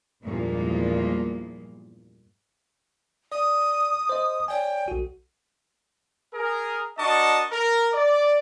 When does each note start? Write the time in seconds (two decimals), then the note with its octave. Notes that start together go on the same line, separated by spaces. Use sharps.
0.23 E2 G2 A#2 F3 G#3 A#3
3.32 D5 D#6
4.09 C5 D#5
4.48 C#5 D5 G5 G#5
4.88 B1 F#4
6.33 G#4 A#4
6.98 D4 F#4 A#4 D#5 A5 C#6
7.50 A#4
7.93 D5